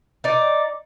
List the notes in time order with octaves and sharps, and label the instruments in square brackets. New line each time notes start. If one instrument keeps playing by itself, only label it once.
[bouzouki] D#4 D5